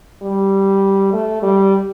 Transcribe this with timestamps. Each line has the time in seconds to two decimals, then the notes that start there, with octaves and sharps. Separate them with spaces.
0.22 G3
1.13 A3
1.42 G3